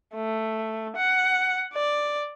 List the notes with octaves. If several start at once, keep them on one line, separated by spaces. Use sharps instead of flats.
A3
F#5
D5